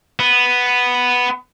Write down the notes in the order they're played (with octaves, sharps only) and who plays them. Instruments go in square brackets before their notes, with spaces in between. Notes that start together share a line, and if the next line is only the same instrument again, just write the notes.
[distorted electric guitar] B3